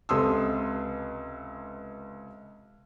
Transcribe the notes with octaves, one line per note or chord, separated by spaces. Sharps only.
C#2 C3 A4 C6 D#6 E6